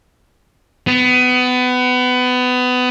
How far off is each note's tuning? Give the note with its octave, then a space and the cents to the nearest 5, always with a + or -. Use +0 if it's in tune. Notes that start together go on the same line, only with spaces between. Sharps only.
B3 +25